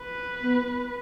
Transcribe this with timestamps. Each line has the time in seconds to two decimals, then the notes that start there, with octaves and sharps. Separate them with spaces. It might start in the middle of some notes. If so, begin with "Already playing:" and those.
Already playing: B4
0.42 B3